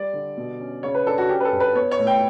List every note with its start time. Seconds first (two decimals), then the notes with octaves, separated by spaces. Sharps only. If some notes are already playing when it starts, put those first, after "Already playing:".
Already playing: G3 D5
0.13 D3
0.37 B2
0.60 C#4
0.83 C#3 C#5
0.95 B4
1.07 D4 A4
1.18 F#4
1.29 C#4 G4
1.40 B4
1.45 A4
1.52 G2
1.60 B4
1.75 B3 C#5
1.91 C#5
1.99 A2
2.07 G5